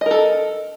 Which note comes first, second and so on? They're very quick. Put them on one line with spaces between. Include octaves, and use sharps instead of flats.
D#5 A#4 A4